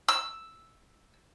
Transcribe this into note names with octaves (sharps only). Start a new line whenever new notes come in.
E6